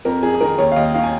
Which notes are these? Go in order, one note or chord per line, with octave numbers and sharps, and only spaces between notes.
F2 A#4
F2 G#4
G#4
D#3 A#4
D#2 C#5
F5
D#2 D#5
D#3 F5
G#5